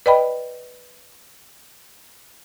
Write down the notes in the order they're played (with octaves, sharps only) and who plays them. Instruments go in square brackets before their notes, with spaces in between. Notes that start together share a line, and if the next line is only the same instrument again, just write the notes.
[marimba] B4 D5 D#5 G5 B5